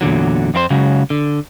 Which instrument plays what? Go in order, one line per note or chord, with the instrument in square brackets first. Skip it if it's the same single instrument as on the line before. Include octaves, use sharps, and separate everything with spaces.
[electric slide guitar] E2 A#2 D3 F#3
F2 C4 E4 C5
C#3 F#3 G#3
D3